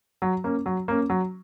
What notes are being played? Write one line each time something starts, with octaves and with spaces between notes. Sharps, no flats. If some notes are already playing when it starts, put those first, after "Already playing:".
F#3
A#3 C#4
F#3
A#3 C#4
F#3